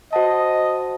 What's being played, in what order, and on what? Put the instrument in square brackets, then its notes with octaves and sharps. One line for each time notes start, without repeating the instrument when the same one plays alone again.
[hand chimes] F#4 C5 F#5 A5 [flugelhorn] D#5